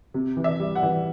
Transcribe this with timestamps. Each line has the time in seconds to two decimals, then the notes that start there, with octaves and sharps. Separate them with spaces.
0.14 C3
0.37 E3
0.44 E5
0.60 G3
0.75 F#5
0.83 E3